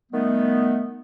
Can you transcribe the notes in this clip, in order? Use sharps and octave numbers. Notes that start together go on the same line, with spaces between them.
D#3 G3 A3 B3